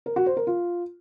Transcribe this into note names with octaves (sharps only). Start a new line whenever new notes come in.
A#4
F#4
C5
A#4
F4